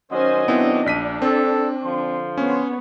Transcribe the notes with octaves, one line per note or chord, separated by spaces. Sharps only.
D#3 F#3 C#4 C5 D#5 G#5
B3 C4 D4 E4
A#1 B6 D#7
C4 A4
D3 F3 C6
B3 C#4 C#5